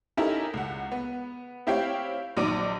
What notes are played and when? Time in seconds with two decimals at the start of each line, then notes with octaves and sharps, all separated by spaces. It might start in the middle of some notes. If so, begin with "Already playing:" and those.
0.17 C#4 D#4 E4 G4 A4 A#4
0.54 C#2 F#5
0.92 B3
1.67 C4 E4 G4 C#5 F5 G5
2.37 A#1 D#3 F#3 D5 D6 D#7